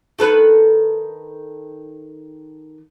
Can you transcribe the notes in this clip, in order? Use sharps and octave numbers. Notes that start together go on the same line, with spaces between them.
D#3 A4 B4